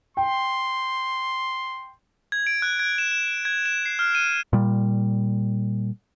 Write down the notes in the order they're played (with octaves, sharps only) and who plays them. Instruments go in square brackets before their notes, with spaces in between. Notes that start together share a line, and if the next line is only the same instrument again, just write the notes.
[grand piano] G5 [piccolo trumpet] C6
[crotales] G#6
D7
F#6
G#6
E7
E7
G#6
E7
C7
F6
D#7
[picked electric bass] A#2 G3